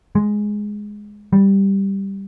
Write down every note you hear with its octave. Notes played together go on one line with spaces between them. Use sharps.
G#3
G3